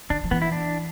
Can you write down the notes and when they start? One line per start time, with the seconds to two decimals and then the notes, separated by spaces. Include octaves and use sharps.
0.10 D3 D4
0.24 F3
0.31 E3 B3
0.42 E4
0.52 D4